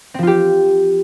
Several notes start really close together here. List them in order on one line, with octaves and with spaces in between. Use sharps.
C4 F3 F4 G4